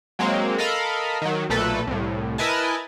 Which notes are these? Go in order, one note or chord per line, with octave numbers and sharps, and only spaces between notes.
F#3 G#3 A#3 C4
A4 A#4 D#5 F5 B5
D#3 F#3
B1 A#2 A3 A4 B4
C2 A2
E4 A#4 B4 D#5 G#5 A5